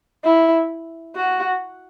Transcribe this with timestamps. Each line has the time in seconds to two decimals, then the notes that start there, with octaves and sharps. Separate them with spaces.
0.24 E4
1.16 F#4